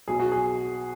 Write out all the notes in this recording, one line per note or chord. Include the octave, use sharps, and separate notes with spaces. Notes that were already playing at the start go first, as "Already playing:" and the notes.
B1 B2 F#3 G#4
F#4
G#4